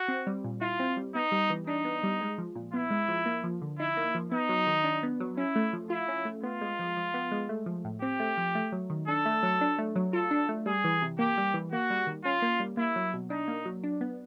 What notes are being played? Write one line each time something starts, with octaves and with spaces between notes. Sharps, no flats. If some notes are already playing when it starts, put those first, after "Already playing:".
Already playing: F#4
C4
G3
A#2
E4 F4
C4
G3
B3 D#4
G3
E3
D4 D#4
B3
G3
G#3
F3
A#2
B3 E4
G#3
F3
A#3
F3
D3
D#4 E4
A#3
F3
B3 D#4
F#3
D#3
D4
B3
F#3
C#4 E4
A3
F3
E4 F4
C#4
A3
B3 F4
G#3
F3
F3
B3
G#3
A3
F3
A2
C4 G4
A3
F3
A3
F#3
D#3
D4 A4
A3
F#3
D4
A3
F#3
F4 A4
D4
A3
G3 G#4
E3
C3
A#3 G4
G3
E3
A#3 F#4
G3
D#3
C#4 F4
A#3
G3
A#3 E4
F#3
B2
D4 D#4
A#3
F#3
D4
B3